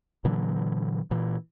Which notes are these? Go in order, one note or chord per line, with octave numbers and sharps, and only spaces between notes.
A#2 D3 E3 F#3
A#2 E3